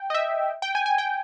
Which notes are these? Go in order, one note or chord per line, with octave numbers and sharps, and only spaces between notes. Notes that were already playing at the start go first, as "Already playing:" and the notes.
Already playing: G5
D#5
E5
G5
G#5
G#5
G5